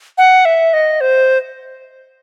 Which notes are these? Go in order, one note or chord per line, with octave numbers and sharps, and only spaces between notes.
F#5
E5
D#5
C5